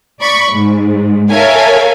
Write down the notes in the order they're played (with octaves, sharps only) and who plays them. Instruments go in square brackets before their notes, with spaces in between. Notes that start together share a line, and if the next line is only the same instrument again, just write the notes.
[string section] D5 B5 C#6
G#2
A4 A#4 C#5 E5 F5 G#5